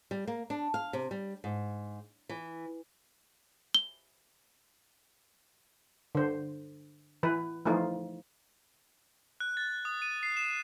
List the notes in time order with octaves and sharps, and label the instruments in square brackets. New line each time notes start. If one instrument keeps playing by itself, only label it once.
[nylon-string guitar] G3
A#3
D4
F5
C3
G3
G#2
E3
[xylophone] G7
[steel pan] D3 C5
E3 B4
E3 F3 A3 D#4 F4
[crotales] F#6
A6
D#6
D#7
C7
E7